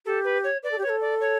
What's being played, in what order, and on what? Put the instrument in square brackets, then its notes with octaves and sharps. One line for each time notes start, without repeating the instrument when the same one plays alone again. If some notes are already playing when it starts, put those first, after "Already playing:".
[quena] G4 [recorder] A4
[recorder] B4
C#5
[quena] B4 [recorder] D5
[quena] A4
G4
[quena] B4 [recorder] C#5
[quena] A4
[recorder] D5
C#5